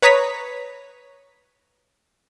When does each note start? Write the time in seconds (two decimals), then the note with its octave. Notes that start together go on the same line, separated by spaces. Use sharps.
0.02 B4 C#5 A#5 D#6 B6